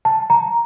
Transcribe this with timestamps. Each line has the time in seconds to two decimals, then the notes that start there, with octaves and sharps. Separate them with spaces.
0.05 A5
0.30 A#5